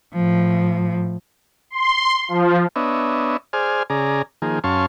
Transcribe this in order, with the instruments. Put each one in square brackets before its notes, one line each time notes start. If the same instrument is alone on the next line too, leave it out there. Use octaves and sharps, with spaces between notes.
[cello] A2 F3
[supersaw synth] C6
F3
[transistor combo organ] B3 D4 C#5 D#5 E5
G#4 C5 D5 G#5 F6
C#3 G#4 D5 A#5
D#3 F3 A#3 G#4
F#2 C#4 F5 A5 C6 C#6